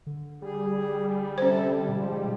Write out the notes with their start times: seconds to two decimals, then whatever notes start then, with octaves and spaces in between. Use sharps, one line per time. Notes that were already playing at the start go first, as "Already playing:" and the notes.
0.06 D3
0.42 G3 G#4
1.38 C3 C#4 A4 C5
1.89 G#2 B2 F3